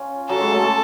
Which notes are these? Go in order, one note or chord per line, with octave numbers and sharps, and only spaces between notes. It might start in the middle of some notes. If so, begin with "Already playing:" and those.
Already playing: C#4 F4
F#3 A4
G#3
A3
A3